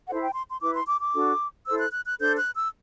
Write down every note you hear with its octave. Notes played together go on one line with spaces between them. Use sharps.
E4 A4 C5 F#5
G5
C6
C6
E4 B4 D6
C6
D6
D6
D4 F#4 A4
E4 A4 C5 E6
F#6
F#6
F#6
D4 A4 C5 G6
F#6
E6